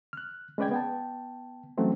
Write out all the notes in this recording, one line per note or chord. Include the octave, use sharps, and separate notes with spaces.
F6 F#6
G#3 C#4 B4 D5 G5 G#6
B3 G5 A5
E3 F#3 A3 C4 C#4